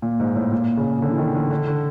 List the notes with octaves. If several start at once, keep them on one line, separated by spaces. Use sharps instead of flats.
A#2
G#2
A2
A#2
C#3
D3
E3
D#3
D3
D3
D3